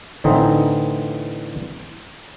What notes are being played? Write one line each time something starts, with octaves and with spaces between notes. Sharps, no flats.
A2 D3 E3 C4 D#4